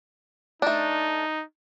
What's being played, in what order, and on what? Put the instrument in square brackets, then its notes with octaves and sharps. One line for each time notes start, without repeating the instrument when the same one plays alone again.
[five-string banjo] A3 D4 [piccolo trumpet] D#4